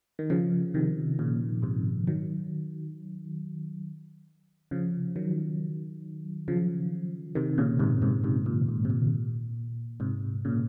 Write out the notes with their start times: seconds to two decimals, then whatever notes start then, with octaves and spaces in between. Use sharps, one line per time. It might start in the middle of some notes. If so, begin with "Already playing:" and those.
0.19 D#3
0.30 C#3 F3
0.74 C3 D#3
1.19 A#2 C#3
1.62 G#2 C3
2.07 D#3 F#3
4.71 C#3 F3
5.16 D#3 F#3
6.48 C#3 F3
7.35 C3 D#3
7.58 A#2 C#3
7.79 G#2 C3
8.02 G#2 C3
8.24 G#2 C3
8.46 A#2
8.69 G#2
8.85 C3
8.90 A#2
10.00 G#2 C3
10.45 A#2 C#3